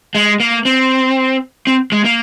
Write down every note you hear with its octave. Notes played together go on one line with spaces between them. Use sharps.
G#3
A#3
C4
C4
G#3
A#3